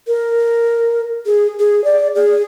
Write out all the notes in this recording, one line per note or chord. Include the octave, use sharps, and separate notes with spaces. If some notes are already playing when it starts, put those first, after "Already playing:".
A#4
G#4
G#4
D5
G#4